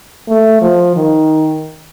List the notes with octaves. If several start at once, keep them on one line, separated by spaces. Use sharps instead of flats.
A3
F3
D#3